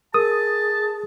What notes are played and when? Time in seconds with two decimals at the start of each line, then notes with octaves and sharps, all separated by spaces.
0.14 G#4 A#4 A5 D#6